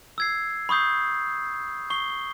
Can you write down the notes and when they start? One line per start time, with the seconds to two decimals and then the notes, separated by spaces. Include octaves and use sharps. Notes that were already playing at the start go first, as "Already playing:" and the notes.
0.18 E6 G#6 C7
0.69 B5 C#6 D#6 G6 C7
1.90 C#6 C7 G7